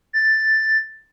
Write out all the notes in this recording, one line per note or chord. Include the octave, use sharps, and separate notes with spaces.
A6